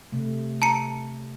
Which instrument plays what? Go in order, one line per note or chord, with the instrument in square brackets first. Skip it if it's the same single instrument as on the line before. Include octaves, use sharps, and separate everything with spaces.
[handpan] C3 A3
[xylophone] A5 A#5 C#7